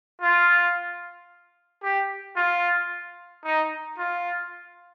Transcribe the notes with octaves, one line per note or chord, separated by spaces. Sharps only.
F4
G4
F4
D#4
F4